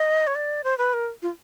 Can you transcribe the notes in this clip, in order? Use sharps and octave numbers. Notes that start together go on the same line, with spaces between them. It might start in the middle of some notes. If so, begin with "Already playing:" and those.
Already playing: D#5
C#5
D5
C5
B4
A#4
F4